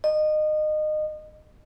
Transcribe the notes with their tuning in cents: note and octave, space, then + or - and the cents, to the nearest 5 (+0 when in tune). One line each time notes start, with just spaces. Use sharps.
D#5 -25